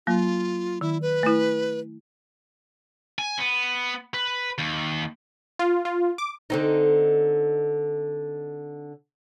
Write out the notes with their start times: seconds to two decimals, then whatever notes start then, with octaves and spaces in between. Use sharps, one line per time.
0.07 F#3 A#3 F4
0.81 D#3 E4
1.02 B4
1.23 A3 E4
3.19 G#5
3.39 B3
4.14 B4
4.58 D#2
5.59 F4
5.85 F4
6.18 D6
6.50 D3 C4 D#4